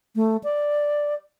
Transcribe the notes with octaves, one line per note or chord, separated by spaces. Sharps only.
A3
D5